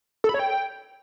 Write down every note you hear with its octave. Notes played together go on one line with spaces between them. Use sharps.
A4
B5
C#5
G5